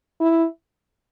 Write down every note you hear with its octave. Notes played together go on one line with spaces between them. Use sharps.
E4